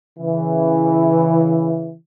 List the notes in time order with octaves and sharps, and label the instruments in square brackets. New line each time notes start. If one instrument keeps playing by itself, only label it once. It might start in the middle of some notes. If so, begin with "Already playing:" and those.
[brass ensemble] C#3 E3